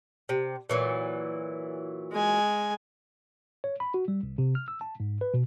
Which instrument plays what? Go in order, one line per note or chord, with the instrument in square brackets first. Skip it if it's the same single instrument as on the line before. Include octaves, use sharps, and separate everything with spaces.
[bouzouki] C3
A#2 E3 F#3
[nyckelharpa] G#3 G#5
[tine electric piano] C#5
B5
F#4
G3
C2
C3
F6
E6
A5
G#2
B4
B2